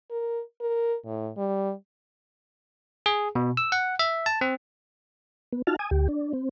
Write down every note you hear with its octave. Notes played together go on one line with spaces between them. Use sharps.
A#4
A#4
A2
G3
G#4
B2
E6
F#5
E5
A5
C4
B3
D#4 F4 F#4 A5 F6
G#5 D#6
D2 G4
D4
C4